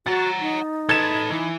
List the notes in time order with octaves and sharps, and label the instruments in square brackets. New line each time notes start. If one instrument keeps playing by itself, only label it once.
[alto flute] F#4 [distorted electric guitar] F#5 A#5 [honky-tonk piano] A6
[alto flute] D#4
[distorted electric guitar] A4 B4 [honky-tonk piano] G#6 A6 E7
[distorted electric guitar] E3